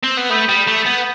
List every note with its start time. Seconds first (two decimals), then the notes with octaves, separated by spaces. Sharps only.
0.04 C4
0.18 B3
0.30 A3 B5 D#6 G6 B6 D#7
0.49 G3
0.67 A3
0.86 B3